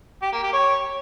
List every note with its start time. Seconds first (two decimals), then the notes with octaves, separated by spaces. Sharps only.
0.22 G4
0.32 A#3
0.43 G4
0.53 C#5